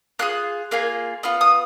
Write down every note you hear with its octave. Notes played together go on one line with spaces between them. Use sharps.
A#3 F4 G#4 F#6
A#3 F4 G#4
B3 F4 F6
D#6